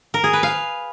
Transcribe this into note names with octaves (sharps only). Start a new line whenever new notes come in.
A#4
G#4
B4
F5